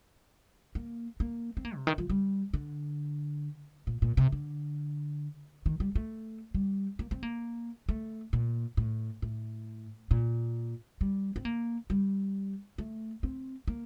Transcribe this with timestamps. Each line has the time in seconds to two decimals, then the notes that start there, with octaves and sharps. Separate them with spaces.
0.75 A#3
1.20 A#3
1.57 C4
1.65 A#3
1.76 C3
1.87 D#3
1.98 F3
2.09 G3
2.54 D3
3.87 A#2
4.02 A#2
4.17 C3
4.32 D3
5.66 D#3
5.80 G3
5.95 A3
6.54 G3
6.99 A#3
7.11 C4
7.23 A#3
7.89 A3
8.33 A#2
8.77 A2
9.22 A2
10.11 A#2
11.01 G3
11.36 C4
11.45 A#3
11.90 G3
12.78 A3
13.23 C4
13.68 A#3